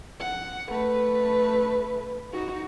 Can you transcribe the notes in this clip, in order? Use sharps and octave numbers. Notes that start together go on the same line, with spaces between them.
F#5
A3 B4
D#4 F#4